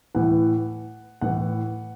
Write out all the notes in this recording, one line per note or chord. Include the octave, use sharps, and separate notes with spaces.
A2 E3 F#5
A2 E3 F#5